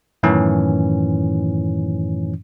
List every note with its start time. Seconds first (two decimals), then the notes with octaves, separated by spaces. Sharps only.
0.23 F#2 A2 D#3 E3 C#4